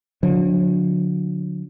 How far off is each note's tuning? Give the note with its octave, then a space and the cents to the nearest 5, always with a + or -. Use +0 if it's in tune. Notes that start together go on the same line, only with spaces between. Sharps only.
D3 -15 F#3 -45